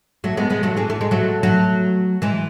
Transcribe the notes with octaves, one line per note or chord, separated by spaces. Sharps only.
F#3 A3
G#3 B3
G#3 B3
F#3 A3
E3 G#3
A3
G#3
F#3 A3
F#3 A3
E3 G#3